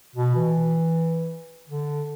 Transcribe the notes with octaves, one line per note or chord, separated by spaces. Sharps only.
B2
E3
D3